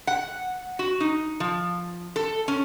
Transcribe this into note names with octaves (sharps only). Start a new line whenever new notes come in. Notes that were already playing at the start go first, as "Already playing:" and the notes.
F#5
F#4
D#4
F3
A4
C#4